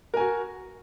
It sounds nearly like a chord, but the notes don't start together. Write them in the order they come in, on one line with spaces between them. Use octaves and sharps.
A#4 G#5 F#4